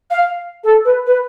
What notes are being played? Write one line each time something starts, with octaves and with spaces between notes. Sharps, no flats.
F5
A4
B4
B4